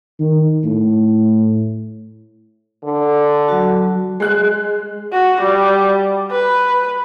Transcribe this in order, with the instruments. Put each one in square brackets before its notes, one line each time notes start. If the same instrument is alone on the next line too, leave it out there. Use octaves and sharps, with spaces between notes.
[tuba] D#3
A2
[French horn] D3
[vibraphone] F#3 F#4
[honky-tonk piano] G#3 F#6
[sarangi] F#4
G3
B4